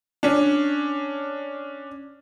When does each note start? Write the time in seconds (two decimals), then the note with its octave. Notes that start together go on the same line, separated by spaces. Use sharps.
0.23 C#4 D4